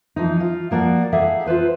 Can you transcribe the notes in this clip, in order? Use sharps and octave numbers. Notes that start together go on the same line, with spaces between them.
E3 F3 D#4
F4
F3 A#3 F#4 D5
A#3 D#4 G#4 A4 E5 F#5
F4 A4 B4 C5